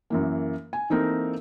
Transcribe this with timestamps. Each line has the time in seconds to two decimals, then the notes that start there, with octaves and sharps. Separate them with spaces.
0.10 F#2 E3 A#3
0.73 G#5
0.90 E3 A#3 C4 D#4 A4 A#4